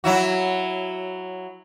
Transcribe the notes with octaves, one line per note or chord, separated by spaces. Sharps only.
F#3 E4 F#4